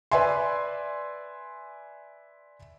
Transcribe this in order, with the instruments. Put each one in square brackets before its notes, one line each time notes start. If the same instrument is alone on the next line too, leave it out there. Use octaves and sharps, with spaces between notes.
[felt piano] B4 D5 E5 G#5 C6